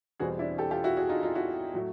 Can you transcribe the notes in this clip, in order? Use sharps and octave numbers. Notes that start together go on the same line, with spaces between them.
E2 B2 G3 C4 F#4 G#4
D4 E4
G4 A4
F4 G4
E4 F#4
F#4 G#4
D#4 F4
D#4 F4
E4 F#4
A2 F#3 A3